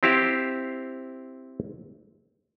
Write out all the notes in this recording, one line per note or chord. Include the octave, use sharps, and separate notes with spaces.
C4 E4 G4 C5 F5